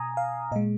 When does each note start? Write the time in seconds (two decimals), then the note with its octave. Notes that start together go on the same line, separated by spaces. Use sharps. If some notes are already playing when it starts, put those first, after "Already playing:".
Already playing: B2 G#5 A#5 D#6
0.17 F5
0.52 A#2 D#5
0.56 G#3